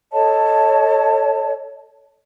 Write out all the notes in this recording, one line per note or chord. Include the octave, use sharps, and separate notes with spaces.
A4 C#5 D#5 A5